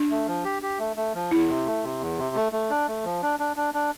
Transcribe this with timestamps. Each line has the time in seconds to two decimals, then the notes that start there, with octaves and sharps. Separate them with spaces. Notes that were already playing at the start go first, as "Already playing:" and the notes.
Already playing: D4
0.10 A3
0.28 F3
0.45 G4
0.62 G4
0.79 A3
0.96 A3
1.15 F3
1.31 E2 E4
1.49 C3
1.66 A3
1.84 C3
2.01 E2
2.18 C3
2.36 A3
2.52 A3
2.70 D4
2.88 A3
3.05 F3
3.22 D4
3.40 D4
3.56 D4
3.74 D4